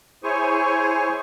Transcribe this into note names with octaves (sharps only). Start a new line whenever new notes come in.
E4 G#4 C5 C#5 G#5 C#6